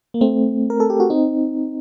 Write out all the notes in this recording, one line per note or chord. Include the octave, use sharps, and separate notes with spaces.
A#3
A3 C4
A#4
A4
G4
F#4
C4 D#4